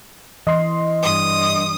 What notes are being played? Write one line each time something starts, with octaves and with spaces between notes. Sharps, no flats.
E3 D#5 C6
G2 D#6